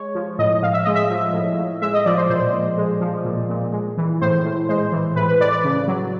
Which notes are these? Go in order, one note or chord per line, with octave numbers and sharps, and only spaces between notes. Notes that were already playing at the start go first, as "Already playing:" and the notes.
Already playing: G#3 C#5
F3
A2 D#5
A2 F5
E5
G#3 D#5
E5
F3
A2
A2
G#3 E5
D#5
F3 D5
C5
A#2 C5
A#2
G#3
F3
A#2
A#2
G#3
E3
A2 C5
A2
G#3 C5
E3
A2 B4
B4
A2 D5
D5
C#3
F#3